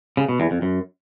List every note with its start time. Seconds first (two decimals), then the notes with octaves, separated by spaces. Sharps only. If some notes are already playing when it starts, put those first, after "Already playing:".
0.17 C#3
0.29 B2
0.40 E2
0.51 F2
0.62 F#2